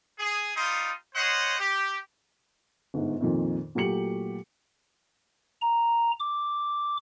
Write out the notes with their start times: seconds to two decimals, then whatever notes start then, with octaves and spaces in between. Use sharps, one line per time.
0.19 G#4
0.55 G3 D#4 F4 C6 D#6
1.14 C5 C#5 D#5 F#5 C6
1.58 G4
2.94 G1 G#2
3.21 F2 A#2 D#3
3.75 A#2 F#3 A3 G4 C#7 F#7
5.62 A#5
6.20 D6